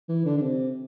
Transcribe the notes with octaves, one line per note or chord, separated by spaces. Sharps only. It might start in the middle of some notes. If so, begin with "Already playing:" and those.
E3
D3
D3
C3